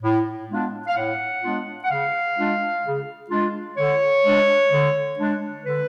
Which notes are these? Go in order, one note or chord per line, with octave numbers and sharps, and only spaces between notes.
A2
G#3 B3 D4 F4
F5
A2 F#5
G#3 B3 D4 F4
F#5
C#3 F5
G#3 D4 F4
C#3
G#3 D4 F4
D3 C#5
G#3 D4
D3
G#3 D4
D3 B4